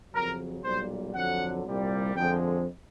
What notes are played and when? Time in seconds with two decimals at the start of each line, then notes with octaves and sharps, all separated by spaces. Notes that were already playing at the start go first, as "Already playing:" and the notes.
0.13 F2 C#3 F#3 A#4
0.63 B1 A#2 G3 C5
1.14 F2 D3 F#3 F#5
1.65 C2 A#2 G3
2.14 F2 D3 F3 G#3 G5